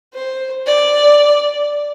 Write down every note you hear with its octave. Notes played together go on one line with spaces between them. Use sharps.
C5
D5